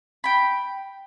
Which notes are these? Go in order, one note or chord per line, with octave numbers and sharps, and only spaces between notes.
G5 B5